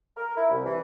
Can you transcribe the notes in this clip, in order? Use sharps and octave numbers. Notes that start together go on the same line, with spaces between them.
A#4
E4
C2
E3